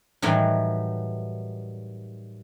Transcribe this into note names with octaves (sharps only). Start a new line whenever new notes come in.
A2 D#3 E3 F#3 G3